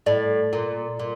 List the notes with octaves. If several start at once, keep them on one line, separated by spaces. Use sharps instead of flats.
A2 D5
A#2
A#2